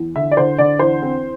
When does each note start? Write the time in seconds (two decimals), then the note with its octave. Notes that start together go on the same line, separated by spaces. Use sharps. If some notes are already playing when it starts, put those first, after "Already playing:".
Already playing: E2
0.15 D3 E5
0.31 D5
0.37 D3 C5
0.58 D3 D5
0.79 E2 C5
1.02 C4